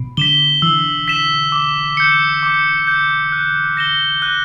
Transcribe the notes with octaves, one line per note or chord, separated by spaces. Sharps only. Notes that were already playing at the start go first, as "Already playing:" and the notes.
Already playing: B2
D3 B6 E7 G7
E3 E6
B6 E7 G7
D6
G6 C#7
D6
G6 C#7
F#6
A#6 E7 G7
F#6